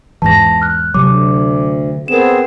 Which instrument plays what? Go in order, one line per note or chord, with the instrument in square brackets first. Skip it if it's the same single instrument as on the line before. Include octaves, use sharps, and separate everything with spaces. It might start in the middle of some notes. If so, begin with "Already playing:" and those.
[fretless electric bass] E2 G#2 E3 [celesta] A5 A#6
[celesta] F6 F#6
[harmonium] D2 [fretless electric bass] C3 F#3 [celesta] D6
[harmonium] B3 C4 G#4 [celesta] A#4 E7